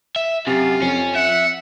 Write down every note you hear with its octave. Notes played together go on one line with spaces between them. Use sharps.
E5
F#2 C3 F4
F2 C#4
E5 F#5